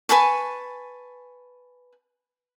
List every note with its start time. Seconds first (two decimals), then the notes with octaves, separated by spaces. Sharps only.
0.09 B4 G#5 A5 C#6